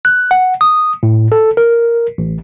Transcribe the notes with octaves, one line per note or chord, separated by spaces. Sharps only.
F#6
F#5
D#6
A2
A4
A#4
A1